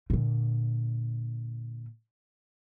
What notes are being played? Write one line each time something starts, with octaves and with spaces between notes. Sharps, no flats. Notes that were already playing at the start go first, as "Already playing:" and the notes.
A#2 D3